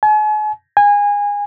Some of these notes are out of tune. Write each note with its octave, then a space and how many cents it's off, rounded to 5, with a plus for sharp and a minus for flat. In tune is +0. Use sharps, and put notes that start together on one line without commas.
G#5 +40
G#5 -25